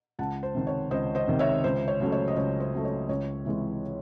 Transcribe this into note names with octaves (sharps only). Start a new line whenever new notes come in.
C#2 F#5 A5
C5
C3 D#3
C#5
C#2 C5 D#5
C5 D#5
C3 D#3
C#5 E5
C#2 C5
C#5
C#3 F#3 A3
C#5
D#5
C#2 C#5
C5
C#3 F#3 A3
C#5
C#2 C#5
C3 E3 G#3